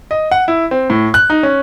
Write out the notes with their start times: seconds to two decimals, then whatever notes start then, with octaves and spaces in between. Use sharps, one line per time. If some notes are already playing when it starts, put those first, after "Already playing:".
0.11 D#5
0.31 F#5
0.48 E4
0.71 C4
0.90 A2
1.14 F#6
1.30 D#4
1.43 C#4